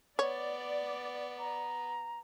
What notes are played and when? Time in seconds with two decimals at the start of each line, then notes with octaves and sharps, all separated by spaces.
0.19 B3 C#5 D5
1.39 A#5